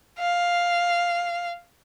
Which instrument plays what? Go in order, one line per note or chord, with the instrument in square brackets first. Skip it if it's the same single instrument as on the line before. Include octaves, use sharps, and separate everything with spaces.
[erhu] F5